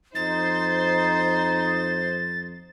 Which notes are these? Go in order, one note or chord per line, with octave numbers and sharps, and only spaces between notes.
F2 D#4 C5 A6